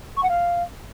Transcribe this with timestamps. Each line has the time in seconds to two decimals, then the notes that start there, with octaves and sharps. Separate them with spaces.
0.17 C#6
0.23 F#5
0.29 F5